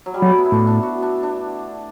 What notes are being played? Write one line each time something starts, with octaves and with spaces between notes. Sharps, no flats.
F#3
G3
F#3 A3
B3
E4
A2 D4
D4
F#4
D4
D4